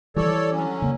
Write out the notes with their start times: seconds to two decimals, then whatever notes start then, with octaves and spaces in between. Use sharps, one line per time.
0.16 E3 G3 A4 C#5 D5
0.51 D3 F#3 C#4
0.82 C#3 A#3